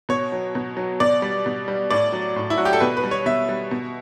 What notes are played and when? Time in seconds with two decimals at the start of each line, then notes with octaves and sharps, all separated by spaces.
0.09 B2 C#5
0.32 F#3
0.55 B2
0.77 F#3
1.00 B2 D5
1.22 G3
1.46 B2
1.68 G3
1.90 A2 D5
2.13 F#3
2.36 A2
2.50 E4
2.58 F#3 F#4
2.65 G4
2.73 A4
2.80 B2 B4
2.97 B4
3.04 G3
3.11 C#5
3.26 B2 E5
3.49 G3
3.71 B2